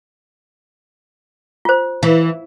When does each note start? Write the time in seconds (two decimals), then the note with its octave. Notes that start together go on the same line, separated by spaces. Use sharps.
1.65 F4 C5
2.03 E3